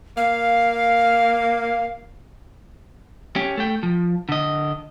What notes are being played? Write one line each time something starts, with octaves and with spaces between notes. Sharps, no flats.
A#3 F5
C#4 G4
A3 G5
F3
D3 D#5